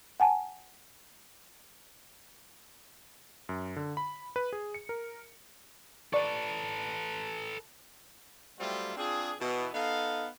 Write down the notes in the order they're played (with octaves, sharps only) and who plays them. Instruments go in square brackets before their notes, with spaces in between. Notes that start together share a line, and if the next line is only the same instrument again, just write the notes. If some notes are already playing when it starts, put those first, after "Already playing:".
[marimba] F#5 G#5 A5
[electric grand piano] F#2
D3
B5
B4
G#4
C#7
A#4
[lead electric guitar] A4 B4 [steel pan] D5 C#6
[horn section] F#3 G3 A3 C4 E4 F4
C4 D4 F4 G#4
B2 E3 B3
B3 D#4 A4 F5